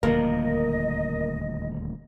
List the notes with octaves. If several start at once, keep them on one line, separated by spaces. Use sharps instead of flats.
D#1 D2 F3 A#3 A#4 D#5